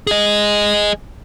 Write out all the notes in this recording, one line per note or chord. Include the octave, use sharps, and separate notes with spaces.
G#4 D#5